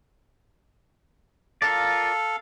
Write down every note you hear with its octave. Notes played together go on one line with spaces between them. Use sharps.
F4 A4 A#4 D5 F5